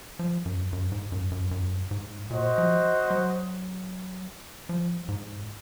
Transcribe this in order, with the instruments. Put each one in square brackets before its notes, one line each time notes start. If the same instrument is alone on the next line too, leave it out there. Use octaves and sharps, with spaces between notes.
[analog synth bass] F3
F#2
F#2
G#2
F#2
F#2
F#2
G#2
[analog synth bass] A#2 [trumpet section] F#4 C5 D#5
[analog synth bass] F3
F#3
F3
G#2